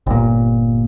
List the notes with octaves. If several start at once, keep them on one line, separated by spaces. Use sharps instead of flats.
G1 A#2